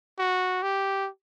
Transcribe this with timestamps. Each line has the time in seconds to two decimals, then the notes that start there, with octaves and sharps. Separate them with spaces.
0.19 F#4
0.63 G4